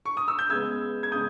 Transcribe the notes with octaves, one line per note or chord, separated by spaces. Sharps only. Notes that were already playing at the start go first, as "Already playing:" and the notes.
C#6
D#6
E6
G6
C#3 G#3 B3 E6 G#6
G#6
C#3 G#3 B3 D#6 G6